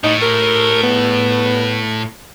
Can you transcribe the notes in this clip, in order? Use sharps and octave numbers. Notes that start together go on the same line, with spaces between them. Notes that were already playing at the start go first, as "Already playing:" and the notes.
A2 D#4
A#4
B3